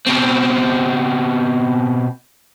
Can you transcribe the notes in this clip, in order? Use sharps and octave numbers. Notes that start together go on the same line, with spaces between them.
B2 C4